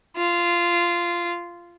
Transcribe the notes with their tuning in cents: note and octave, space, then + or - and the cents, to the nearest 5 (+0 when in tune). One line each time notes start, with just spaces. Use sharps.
F4 -15